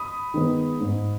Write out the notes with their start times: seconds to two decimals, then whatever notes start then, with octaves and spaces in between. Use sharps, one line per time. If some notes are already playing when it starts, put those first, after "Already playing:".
Already playing: B5 D#6
0.34 D#3 G#3 B3
0.81 G#2